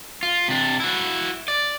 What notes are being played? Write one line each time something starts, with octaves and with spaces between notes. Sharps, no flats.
F4
C3 D4
E4 F#4
D5